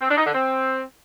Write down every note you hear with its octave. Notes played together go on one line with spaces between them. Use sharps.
C4
D4
D#4
D3
C4